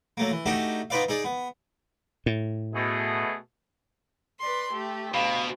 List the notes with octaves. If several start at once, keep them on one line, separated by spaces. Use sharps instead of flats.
F#3 A3 A#3
E3
A3 D4 D#4 F#4 G4
B3 D#4 F4 B4 D5 F5
D#4 G#4 D5
B3
A2
B2 A3 G#4
B4 D5 C6
A3 G4
D2 B2 F5 B5